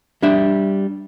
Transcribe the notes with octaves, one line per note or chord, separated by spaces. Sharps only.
G3 D4 E5